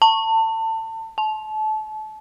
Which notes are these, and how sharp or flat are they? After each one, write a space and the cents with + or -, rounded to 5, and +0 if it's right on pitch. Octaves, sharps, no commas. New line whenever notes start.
A5 +30
A5 -30